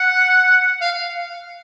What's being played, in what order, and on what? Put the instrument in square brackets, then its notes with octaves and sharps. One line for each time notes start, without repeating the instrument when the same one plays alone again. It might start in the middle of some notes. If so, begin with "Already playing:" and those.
Already playing: [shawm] F#5
F5